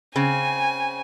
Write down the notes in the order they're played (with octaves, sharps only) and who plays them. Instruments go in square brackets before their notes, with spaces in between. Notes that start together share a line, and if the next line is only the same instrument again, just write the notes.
[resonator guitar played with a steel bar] C#3 C4 [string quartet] G#5